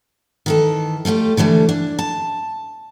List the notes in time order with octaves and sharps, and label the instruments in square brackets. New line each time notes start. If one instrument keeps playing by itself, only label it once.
[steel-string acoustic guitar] D#3 E3 A4
G3 A3 F4 G4
D3 E3 G3 A3
D4
A5